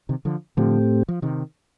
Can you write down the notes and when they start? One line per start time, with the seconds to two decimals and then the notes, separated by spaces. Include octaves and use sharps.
0.09 C3 D#3
0.25 D3 F3
0.57 A2 D3 F3 A3 C4 G4
1.08 F3
1.22 C3 D#3